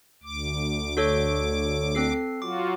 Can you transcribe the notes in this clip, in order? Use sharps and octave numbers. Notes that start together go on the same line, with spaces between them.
D2 D6
F#4 A4 C#5
C4 A4 C7
F#3 F4 F#4 D6